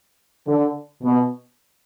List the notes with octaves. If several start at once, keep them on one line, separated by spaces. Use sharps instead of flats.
D3
B2